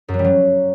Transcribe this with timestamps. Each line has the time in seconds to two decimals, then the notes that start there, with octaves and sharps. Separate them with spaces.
0.08 F#2
0.14 F#3
0.19 G3
0.24 F#3